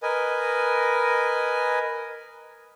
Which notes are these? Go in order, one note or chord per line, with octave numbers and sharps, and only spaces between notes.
A#4 B4 D#5 G#5